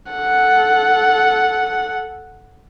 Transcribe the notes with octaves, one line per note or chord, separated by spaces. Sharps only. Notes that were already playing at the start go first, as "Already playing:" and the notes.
A4 F#5